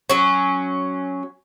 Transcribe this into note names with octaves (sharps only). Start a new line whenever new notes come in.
F#3 C#4